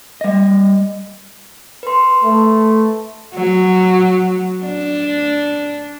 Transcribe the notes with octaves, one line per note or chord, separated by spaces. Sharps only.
G3 D#5
B4 C6
A3
F#3
D4